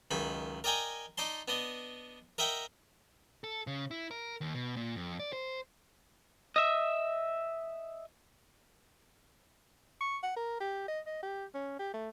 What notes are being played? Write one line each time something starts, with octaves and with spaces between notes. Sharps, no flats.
C#2 F#2 D#3 B5
A#4 D5 D#5 G5 G#5 A#5
D#4 D5 A5 C6
B3 D4 D#5
A#4 D#5 E5 F#5 G5
A4
C#3
E4
A#4
D#2
B2
A#2
F2
D5
C5
D#5 E5
C#6
F#5
A#4
G4
D#5
D#5
G4
C#4
G4
A3